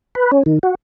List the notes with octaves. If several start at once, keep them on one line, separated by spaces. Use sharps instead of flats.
B4
C#4
D#3
F#4